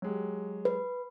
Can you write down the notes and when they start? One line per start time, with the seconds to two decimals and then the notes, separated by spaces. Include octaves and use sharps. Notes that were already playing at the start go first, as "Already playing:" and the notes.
0.02 F#3 G#3 G4
0.65 B4